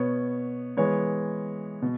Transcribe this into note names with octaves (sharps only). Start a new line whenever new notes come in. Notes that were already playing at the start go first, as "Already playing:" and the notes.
Already playing: B2 B3 C#5
E3 G#3 B3 C#5
B2